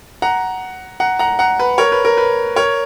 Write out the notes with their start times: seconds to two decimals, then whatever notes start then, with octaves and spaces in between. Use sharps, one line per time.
0.22 F#5 A#5
1.00 F#5 A#5
1.19 F#5 A#5
1.39 F#5 A#5
1.59 B4
1.78 A#4 C#5
1.92 B4
2.05 A#4
2.17 B4
2.56 A#4 C#5